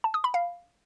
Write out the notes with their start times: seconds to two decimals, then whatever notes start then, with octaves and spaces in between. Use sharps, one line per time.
0.04 A5
0.14 D#6
0.24 B5
0.34 F5